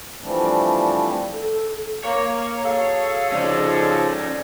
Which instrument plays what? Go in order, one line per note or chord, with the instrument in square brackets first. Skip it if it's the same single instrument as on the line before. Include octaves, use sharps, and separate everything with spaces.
[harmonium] E3 F3 G3 A3 C4 D4
[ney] A4
[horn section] A#3 [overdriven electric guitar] C#5
[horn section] F#4 G#4 A4 [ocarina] F5
[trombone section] C#3 F3 [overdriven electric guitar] C#4 D#4 [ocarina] D5